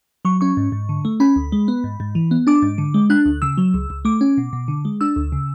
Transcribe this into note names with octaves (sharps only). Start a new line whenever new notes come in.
F#3 C#6
C#4 C#6
G#2
G#2
D3
A3
C#4 B5
D2
G#3
B3
G#2
G#2
E3
B3
D4 D6
G#2
D3
G#3
D4 F#6
D2
C#3 E6
F#3
C#2
C#2
A3 D6
C#4
B2
B2
D3
G#3
D4 E6
D2
C#3